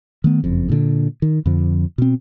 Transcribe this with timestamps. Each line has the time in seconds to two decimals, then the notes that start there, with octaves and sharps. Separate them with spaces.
0.24 D#3 A3 B3
0.44 F#1 F2
0.69 A#2 D3 D4
1.22 D#3
1.46 F2 D3 F3
1.98 B2 C4